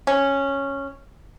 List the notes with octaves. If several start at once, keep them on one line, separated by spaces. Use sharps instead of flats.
C#4